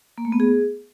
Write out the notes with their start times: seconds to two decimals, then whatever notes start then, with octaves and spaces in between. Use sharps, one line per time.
0.18 A#3
0.25 A3
0.32 B3
0.40 G#4